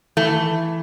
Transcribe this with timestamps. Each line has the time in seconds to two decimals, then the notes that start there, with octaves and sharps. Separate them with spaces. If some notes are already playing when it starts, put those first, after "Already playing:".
0.17 E3 A3